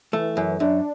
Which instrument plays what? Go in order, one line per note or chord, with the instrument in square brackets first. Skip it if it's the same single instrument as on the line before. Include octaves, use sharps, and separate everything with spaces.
[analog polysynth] E3 [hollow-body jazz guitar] A3
[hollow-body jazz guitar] F#2
[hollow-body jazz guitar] F#2 [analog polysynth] D4